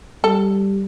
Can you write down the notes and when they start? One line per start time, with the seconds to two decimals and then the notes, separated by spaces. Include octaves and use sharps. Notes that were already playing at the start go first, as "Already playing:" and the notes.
0.24 G3 A4